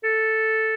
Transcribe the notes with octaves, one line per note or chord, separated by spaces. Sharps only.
A4